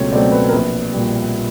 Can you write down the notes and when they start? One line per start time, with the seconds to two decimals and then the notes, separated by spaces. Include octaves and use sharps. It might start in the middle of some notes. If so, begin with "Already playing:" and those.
Already playing: C#2 B2 F#3 A3 C4 C#5
0.12 B2 F#3 A3 C4 D5
0.32 B4
0.48 A#4
0.52 A#1 B4
0.93 A#2 G3